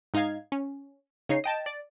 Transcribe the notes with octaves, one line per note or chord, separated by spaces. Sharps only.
G#2 D#4 D#5 F5 G#6
C#4
C#3 D#4 C#5 C7
D#5 G5 A5
D5